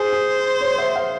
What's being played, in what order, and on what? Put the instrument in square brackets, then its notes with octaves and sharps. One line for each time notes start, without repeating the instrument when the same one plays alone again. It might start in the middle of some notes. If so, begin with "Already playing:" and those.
Already playing: [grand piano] G#4 [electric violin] C5
[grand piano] G#4
C#5
E5
F5